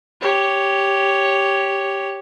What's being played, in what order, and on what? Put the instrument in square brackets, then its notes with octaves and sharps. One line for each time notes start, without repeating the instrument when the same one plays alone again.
[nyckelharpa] G4 C#5